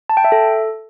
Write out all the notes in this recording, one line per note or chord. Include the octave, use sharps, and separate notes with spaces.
A5
G5
E5
A4